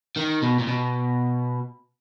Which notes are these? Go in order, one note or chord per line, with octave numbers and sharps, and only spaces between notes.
D#3
B2
A#2
B2